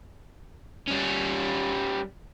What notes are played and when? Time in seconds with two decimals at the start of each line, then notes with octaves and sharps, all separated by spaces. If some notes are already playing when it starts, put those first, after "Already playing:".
0.88 G3 C#4